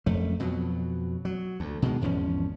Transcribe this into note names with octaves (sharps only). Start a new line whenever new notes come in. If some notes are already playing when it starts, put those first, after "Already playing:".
F#1 F2 A3
F2 B2 F#3
F#3
D2
B2 D#3 G#3
G#1 E2 F3 C#4